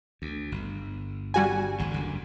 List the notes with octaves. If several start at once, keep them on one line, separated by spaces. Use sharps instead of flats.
D2
G1
G3 F#4 G#5
G#1 E2 G#2
F#1 D2 D3